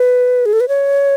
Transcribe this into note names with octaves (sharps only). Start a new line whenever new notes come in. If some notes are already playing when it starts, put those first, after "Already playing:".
Already playing: B4
G#4
A4
B4
C#5